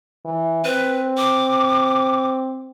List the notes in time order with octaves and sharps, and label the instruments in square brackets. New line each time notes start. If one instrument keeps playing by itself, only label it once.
[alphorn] E3
[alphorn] C4 [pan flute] B4
[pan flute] D6